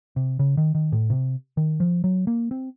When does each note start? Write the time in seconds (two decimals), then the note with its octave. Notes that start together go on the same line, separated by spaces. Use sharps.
0.16 C3
0.39 C#3
0.57 D#3
0.75 D#3
0.92 A2
1.10 C3
1.57 D#3
1.80 F3
2.04 F#3
2.27 A#3
2.51 C4